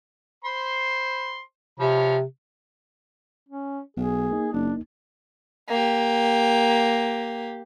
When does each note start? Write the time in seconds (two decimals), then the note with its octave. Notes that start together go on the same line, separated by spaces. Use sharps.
0.44 C5 B5 C6
1.80 C3 F3 C#5 B5
3.49 C#4
3.97 B1 G#4
4.31 A#3 D#4
4.53 F#1 D4
5.69 A#3 G4